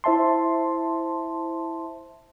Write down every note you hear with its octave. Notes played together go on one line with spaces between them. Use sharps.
E4 C5 E5 A5 C6